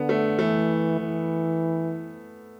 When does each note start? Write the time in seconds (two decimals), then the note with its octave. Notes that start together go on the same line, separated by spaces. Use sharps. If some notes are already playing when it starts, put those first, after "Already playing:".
Already playing: D3 B3
0.09 A3
0.39 E3 A3
1.00 E3